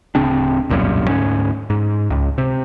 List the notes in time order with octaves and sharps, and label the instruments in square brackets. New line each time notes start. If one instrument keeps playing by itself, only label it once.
[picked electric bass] D1 C#3 C4 D4
E1 C2 F#2 A#2
D2 G#2 C#4
G#2
C#2
C3